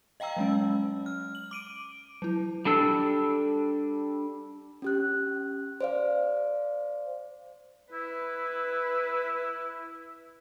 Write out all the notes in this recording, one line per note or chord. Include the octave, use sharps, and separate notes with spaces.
D#5 F5 G5 A#5 E6
F#3 G#3 C#4
F6
F#7
D6 D7 D#7
F#3 E4
G3 D4 A4 E6
C#4 G4 F#6
C5 D5 F5
E4 B4